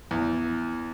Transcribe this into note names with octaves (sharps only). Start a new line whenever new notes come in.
E2